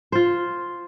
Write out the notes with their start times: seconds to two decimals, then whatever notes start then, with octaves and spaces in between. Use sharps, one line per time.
0.12 F4 C5